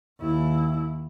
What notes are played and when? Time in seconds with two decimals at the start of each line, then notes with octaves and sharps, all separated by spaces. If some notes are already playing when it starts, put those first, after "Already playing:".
0.20 D#2 E4